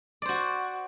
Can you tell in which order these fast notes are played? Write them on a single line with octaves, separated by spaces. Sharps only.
D5 C5 F#4